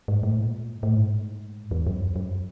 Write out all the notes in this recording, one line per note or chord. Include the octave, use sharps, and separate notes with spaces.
G#2
A2
A#2
A2
G#2
E2
F#2
F#2